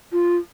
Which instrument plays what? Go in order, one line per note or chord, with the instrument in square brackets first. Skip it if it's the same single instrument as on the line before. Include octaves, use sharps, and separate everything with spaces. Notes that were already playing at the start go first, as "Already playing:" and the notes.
[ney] F4